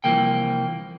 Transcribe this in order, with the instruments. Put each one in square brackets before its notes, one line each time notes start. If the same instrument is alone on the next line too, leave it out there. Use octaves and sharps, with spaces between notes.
[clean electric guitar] C2 E3 F3 A#3 G5